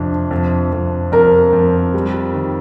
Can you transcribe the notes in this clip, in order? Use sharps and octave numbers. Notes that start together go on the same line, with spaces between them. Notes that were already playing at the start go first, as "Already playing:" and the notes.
Already playing: F2 C3 D4
F2
F2
F2 A#4
F2
G3
D#3